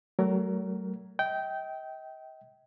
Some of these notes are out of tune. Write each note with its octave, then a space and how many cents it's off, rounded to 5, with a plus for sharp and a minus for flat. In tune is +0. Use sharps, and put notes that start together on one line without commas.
F#3 +35 A3 +0 A#4 +0
D#5 +40 G5 -15